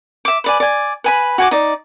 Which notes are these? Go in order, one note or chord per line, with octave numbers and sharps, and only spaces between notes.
E5 D6
B4 D5 G#5
D5 G#5
B4 G#5 B5
F#4 G#5 D6
D#4 D5